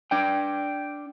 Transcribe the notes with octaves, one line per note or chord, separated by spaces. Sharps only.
D4 D5 G5